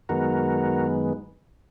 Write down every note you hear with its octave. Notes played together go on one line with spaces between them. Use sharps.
F#2 D#3 G#3 B3 F#4 A#4